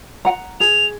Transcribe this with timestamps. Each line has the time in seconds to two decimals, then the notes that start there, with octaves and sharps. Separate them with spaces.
0.25 F#5 A#5
0.60 G#4 F7